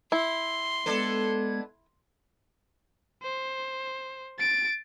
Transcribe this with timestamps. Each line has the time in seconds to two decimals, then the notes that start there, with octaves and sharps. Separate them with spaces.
0.12 E4 C6
0.86 G#3 B3 D4 A4 B4 G#6
3.23 C5
4.39 A6 D7